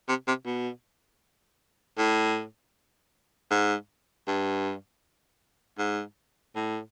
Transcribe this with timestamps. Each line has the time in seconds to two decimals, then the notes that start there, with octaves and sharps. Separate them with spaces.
0.08 C3
0.27 C3
0.46 B2
1.98 A2
3.51 G#2
4.27 G2
5.78 G#2
6.56 A2